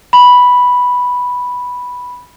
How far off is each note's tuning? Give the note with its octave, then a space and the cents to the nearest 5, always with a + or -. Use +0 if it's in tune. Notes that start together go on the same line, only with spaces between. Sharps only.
B5 -5